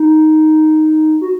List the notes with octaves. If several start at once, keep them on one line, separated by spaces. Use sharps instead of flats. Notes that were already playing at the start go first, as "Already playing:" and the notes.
Already playing: D#4
F#4